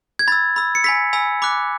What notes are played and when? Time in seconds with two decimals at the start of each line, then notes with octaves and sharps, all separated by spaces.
0.19 G#6
0.28 B5 E6 A6
0.56 B5 E6
0.75 C#7
0.84 G#5 B5 E6 B6
1.13 G#5 B5 E6
1.42 B5 D6 F#6